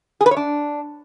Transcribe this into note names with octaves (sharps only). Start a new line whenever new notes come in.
G#4
B4
C#5
D4